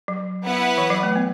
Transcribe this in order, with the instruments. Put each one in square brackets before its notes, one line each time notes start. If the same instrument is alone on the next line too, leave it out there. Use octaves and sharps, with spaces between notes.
[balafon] F#3
[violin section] B3 E4 B4 F#5
[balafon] E3
F#3
A3
B3